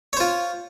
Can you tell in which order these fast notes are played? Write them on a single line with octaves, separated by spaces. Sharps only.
C#5 C5 F4